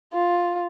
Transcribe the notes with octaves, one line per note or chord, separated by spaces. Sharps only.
F4